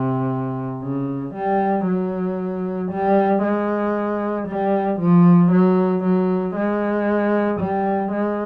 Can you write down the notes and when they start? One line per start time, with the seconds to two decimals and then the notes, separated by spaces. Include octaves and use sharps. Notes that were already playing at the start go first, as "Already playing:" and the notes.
Already playing: C3
0.83 C#3
1.35 G3
1.87 F#3
2.91 G3
3.44 G#3
4.48 G3
5.00 F3
5.52 F#3
6.04 F#3
6.56 G#3
7.60 G3
8.12 G#3